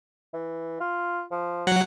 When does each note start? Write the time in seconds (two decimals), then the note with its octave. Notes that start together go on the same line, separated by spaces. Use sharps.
0.34 E3
0.81 F4
1.31 F3
1.67 F#3 F#5